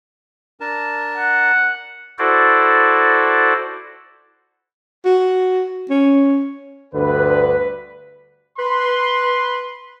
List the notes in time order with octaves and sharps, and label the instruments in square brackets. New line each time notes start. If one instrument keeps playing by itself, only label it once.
[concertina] D4 A#4 A5
[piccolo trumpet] F#5
[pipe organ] E4 F#4 A4 C5 D5
[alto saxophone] F#4
C#4
[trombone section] D2 G2 D3 [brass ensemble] B4
[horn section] B4 C6